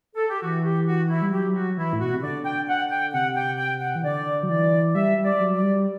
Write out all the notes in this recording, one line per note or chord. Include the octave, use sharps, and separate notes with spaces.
A4
G4
E3 F#4
G4
F#4
E4
G3
F#3 G4
F#4
E3 E4
A2
B2 F#4
C3
D3 D5
G5
F#5
G5
C3 F#5
G5
G5
F#5
E3
D3 D5
F#3
E3 D5
G3 E5
G3
D5
G3
F#3
D5
G3